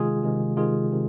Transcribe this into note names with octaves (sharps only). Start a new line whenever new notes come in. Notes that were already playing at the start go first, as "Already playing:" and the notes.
Already playing: C3 D#3 G#3 F4 G#4
C3 D#3 G#3
C3 D#3 G#3 F4 G#4
C3 D#3